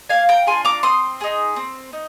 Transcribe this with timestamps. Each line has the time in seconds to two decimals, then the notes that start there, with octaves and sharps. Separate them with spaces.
0.09 A#3 F5 G#5
0.29 G5 A#5
0.47 D4 F4 G#4 G#5 C6
0.65 A#5 D6
0.83 C4 C6 D#6
1.21 D#4 G#4
1.56 C4
1.93 D#4